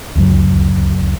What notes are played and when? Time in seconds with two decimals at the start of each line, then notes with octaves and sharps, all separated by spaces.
0.15 D1 C#2 F#2 F#3